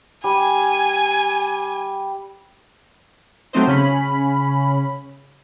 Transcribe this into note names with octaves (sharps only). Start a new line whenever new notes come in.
G3 G#5
F#3 A3 C4 D#4 C5
C#3 C#4 B5